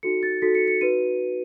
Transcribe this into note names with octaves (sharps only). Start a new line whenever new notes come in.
D#4 F#4 A4 C#7
A6
D#4 F#4 A4 B6
C#7
C#7
D#4 F#4 B4 D#7